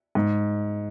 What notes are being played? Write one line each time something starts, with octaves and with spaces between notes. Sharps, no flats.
G#2